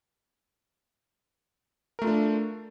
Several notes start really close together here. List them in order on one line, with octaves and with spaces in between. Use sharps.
A#4 A3 F4 D4